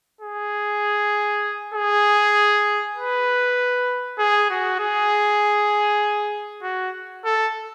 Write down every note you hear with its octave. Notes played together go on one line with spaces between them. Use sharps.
G#4
G#4
B4
G#4
F#4
G#4
F#4
A4